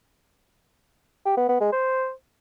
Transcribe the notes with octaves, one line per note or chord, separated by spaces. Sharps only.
G4
B3
B3
G#3
C5